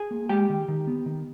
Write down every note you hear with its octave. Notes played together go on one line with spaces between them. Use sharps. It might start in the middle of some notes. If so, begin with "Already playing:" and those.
Already playing: G#4 G#5
A#3
G#3 G4 G5
D#3
D#3
B3
D#3